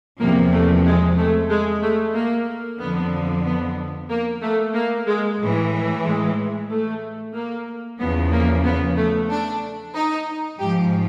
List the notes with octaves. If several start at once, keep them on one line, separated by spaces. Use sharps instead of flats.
E2 C3 F3 A#3
A3
G#3
A3
G#3
A3
A#3
F2 D3 F3 B3
B3
A#3
A3
A#3
G#3
A2 E3
G#3
A3
A#3
E2 C#3 F3 B3
A#3
B3
A3
D4
D#4
G#2 F3 G4